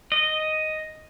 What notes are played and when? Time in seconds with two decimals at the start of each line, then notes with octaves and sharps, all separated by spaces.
0.12 D#5